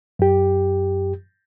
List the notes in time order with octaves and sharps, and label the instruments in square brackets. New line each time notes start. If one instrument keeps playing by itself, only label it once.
[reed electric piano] F#2 G4